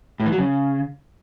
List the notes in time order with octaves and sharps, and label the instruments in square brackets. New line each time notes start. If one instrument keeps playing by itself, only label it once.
[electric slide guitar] A2
E3
F#3
C#3